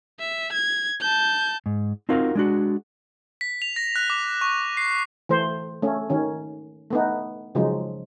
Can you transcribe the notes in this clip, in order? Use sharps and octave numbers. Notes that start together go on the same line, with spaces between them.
E5
G#6
A5 G6
G#2
C4 D#4 F4 F#4 A#4 F5
G#3 D4 F#4
B6
F7
A#6
F#6
D6
C#6
C7
E3 A3 C5
A3 C#4
D#3 C#4
A3 B3 D#4
C#3 F3 F#3 G#3 D#4